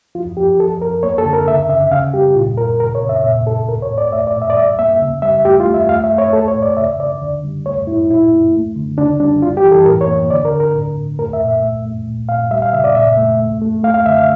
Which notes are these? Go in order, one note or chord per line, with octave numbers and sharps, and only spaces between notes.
F3 F4
F3 G4
F3 A4
F3 A#4
A#3 C#5
A4
D3
A#4
C#3 E5
C#3 E5
C#3 F5
G3 G4
A#2 F4
A#2 A#4
C#3 A#4
C#5
C#3
E5
A#2 E5
A#2 A4
A2 A#4
C#5
A2
D5
A3 E5
D5
A#2
E5
D5
G3 E5
A#3 E5
C#3
G3 E5
A3 G4
F4
A3
E5
A3 F5
E5
A3
C#5
A3 A4
C#5
A2
D5
C#3 E5
C#3 D5
D3
G3
A3 C#5
A2 E4
A#2 E4
A#3
A3
D3
C#3 D4
G3 D4
G3 F4
G4
E3
A4
A2 A#4
C#5
A#3
D3 D5
A#4
D3
A#4
A2
A2
A3 A#4
E5
A#2
E5
A3
A3
A#2
A#2 F5
G3 E5
F5
C#3 E5
D5
A#2 E5
A3
A3
A3
A3 F5
F5
D3 E5
F5